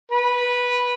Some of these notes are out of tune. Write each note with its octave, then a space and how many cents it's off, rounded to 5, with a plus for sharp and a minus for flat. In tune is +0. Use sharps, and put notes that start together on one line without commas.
B4 -10